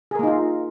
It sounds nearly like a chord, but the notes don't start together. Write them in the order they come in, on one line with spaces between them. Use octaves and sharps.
G#4 A#4 A#3 D#4 F4